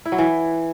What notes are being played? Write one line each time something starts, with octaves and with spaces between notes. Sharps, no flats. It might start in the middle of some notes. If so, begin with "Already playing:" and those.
E4
F#3
E3